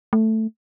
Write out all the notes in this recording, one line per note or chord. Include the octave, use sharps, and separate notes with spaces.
A3